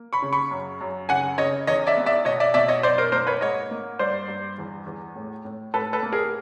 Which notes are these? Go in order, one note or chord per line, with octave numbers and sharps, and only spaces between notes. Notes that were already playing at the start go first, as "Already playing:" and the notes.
Already playing: A#3
B5 C#6
C#3
B5 C#6
F#2
F#2
C#3 F#5 G#5
C#3 C#5 D#5
E2 C#5 D#5
D5 E5
B3
D5 E5
B2 C#5 D#5
D5 E5
B2 D5 E5
C#5 D#5
F#2 C5 D5
A#4 C5
A#3 A#4 C5
B4 C#5
G#2 C#5 D#5
A#3
G2 C5 D5
G2
E2
E2
A2
A2
A2 A4 B4
A4 B4
A#3
G#4 A#4